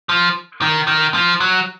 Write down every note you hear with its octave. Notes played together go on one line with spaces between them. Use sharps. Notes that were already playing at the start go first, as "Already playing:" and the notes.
F3
D#3
D#3
F3
F#3